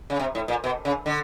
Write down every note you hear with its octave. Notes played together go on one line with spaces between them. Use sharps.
C#3
C3
A2
A#2
B2
C#3
D3